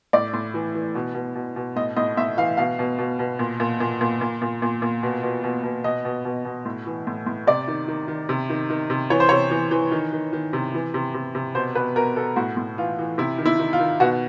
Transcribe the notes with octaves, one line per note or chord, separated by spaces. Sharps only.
A2 D5
A2
E3
E3
B2
B2
B2
B2
A2 D#5
A2 D#5
A2 E5
E3 F5
B2 F5
B2
B2
B2
A#2
A#2
A#2
A#2
A#2
A#2
A#2
A#2
B2
B2
B2
B2
B2 D#5
B2
B2
B2
A2
E3
A2
A2
C3 D5
D#3
D#3
D#3
C3
D#3
D#3
C3
E3 C#5
C5
C3 C#5
E3
E3
D#3
D#3
D#3
C3
E3
C3
C3
C3
B2 C5
B2 B4
B2 A#4
B2 A4
A2 F#4
A2
E3 F4
E3
C3 E4
D#3
E4
D#3
F4
D#3
B2 F#4